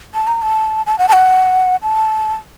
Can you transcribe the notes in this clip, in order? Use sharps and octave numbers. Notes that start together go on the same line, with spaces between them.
A5
A#5
A5
A5
F#5
A5
F#5
A5